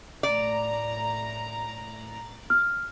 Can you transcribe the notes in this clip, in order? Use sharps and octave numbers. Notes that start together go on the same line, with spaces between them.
A2 D5 A#5
F6